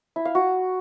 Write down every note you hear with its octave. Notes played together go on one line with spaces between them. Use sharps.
E4
F5
F#4